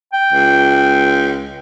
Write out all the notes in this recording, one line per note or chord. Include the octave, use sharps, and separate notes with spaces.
G5
C#2